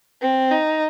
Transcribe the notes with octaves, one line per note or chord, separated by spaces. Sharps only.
C4
D#4